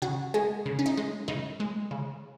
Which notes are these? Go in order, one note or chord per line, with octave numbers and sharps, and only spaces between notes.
C#3 F#4
G#3 G#4
C#3
C#4
D#4
G#3
C#3 D#4
G#3
C#3